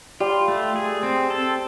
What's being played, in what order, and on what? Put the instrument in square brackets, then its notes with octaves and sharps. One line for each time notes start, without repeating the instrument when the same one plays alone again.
[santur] G3 G4 [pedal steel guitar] F4
[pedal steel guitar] A3
G#4
C4
A4